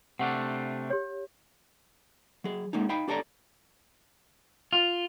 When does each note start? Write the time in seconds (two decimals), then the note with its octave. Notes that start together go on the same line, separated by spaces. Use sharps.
0.19 C3 A3 D4 F#5
0.90 G4 C#5
2.44 F#3 G#4
2.73 G#3 A#3 C#4 D#4
2.89 D#4 F5 G5 B5
3.08 D4 G4 A4 C#5 D5 A#5
4.73 F4